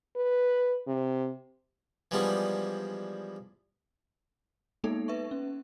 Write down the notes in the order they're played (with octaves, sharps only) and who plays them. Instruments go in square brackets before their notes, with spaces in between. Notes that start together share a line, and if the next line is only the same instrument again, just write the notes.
[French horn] B4
C3
[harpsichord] E3 F3 G3 G#3 B3 D4
[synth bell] G#3 A#3 B3 D#4 A4
B4 E5 C#6
C#4